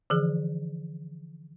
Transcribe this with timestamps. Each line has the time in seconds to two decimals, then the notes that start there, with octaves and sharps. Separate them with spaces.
0.10 D3 E3 F3 G#4